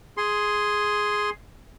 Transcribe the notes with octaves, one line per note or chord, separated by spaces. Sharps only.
G#4 C6